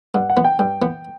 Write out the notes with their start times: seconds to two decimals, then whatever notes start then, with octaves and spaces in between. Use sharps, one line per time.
0.14 G2 F#5
0.30 F#5
0.37 E3 B3
0.44 G5
0.59 G2 G5
0.82 E3 B3